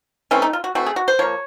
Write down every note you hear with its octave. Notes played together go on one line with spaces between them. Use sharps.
E3 A3 C4 C#4
D#4
F4
F#4
E3 A3 C4 F#4
G#4
F#4
C5
F3 A#3 C#5